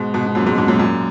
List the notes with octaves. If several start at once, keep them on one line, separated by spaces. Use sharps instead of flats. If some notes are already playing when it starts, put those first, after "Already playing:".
Already playing: G#2 B2
G#2 B2
B2
F#2 A#2
G#2 B2
G#2 B2
F#2 A#2
F#2 A#2